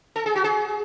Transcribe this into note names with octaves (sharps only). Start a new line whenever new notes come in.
A4
G#4
F#4
G#4